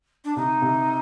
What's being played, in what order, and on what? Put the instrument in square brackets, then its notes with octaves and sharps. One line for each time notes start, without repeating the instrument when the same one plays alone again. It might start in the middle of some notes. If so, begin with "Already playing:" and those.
[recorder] D4
[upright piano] C3 [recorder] D#4
[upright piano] C3